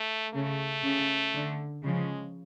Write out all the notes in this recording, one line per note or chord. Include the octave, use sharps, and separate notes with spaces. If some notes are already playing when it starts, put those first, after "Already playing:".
Already playing: A3
C#3 A3
C#3
D3
C#3 F3 G#3